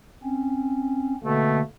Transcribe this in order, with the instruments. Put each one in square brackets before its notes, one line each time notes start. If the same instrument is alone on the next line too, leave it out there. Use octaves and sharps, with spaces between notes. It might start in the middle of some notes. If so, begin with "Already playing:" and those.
[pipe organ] C4 C#4
[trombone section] B2 A3 [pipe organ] D3 A#3